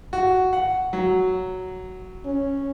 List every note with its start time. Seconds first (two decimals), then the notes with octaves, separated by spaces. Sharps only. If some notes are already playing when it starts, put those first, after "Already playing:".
0.13 F#4
0.53 F#5
0.93 F#3
2.25 C#4